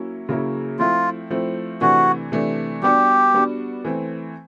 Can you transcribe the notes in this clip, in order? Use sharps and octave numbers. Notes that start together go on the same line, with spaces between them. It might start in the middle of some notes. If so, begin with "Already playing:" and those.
Already playing: F#3 A#3 C#4 E4
C#3 F#3 A#3 C#4 E4
F3 A3 C4 E4 F4
F3 A3 C4 E4
C3 E3 A3 D4 F#4
C3 E3 A3 D4
G3 B3 D4 F#4 G4
G3 B3 D4 F#4
E3 A3 C4